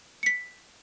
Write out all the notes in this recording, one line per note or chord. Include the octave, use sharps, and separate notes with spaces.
B6 C#7